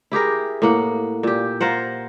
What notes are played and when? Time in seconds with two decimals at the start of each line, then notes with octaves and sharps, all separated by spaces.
0.12 E4 G4 G#4 A#4
0.62 A2 A#3 F#5
1.23 A#2 G4
1.61 F4 A#4 C5 F#5